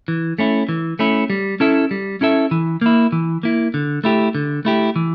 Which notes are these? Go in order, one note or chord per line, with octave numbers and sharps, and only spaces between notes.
E3
A3 C#4 E4
E3
A3 C#4 E4
G3
C#4 E4 A4 E5
G3
C#4 E4 A4 E5
E3
A#3 E4
E3
A#3 E4
D3
A3 E4 G4
D3
A3 E4 G4
E3